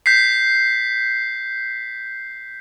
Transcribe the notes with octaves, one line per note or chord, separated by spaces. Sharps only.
G6 B6 C7